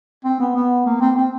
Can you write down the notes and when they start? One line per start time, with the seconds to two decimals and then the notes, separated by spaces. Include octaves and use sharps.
0.25 C4
0.40 B3
0.55 B3
0.86 A#3
1.01 C4
1.16 C4